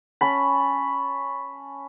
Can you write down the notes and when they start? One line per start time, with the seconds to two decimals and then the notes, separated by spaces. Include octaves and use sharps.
0.21 C#4 A5 B5